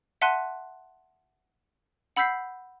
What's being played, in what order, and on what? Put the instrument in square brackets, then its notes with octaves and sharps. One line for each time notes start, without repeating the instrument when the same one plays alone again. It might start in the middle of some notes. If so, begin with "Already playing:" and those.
[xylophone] E5 F#5 A5 C6 F#6 D#7
F#5 B5 E6 G6 B6 C7